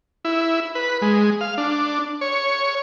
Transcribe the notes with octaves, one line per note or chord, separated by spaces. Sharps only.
E4
B4
G#3
F5
D4
C#5